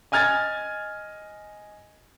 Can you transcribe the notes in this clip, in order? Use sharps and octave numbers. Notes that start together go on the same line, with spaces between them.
D#5 G#5 F6 G#6 A6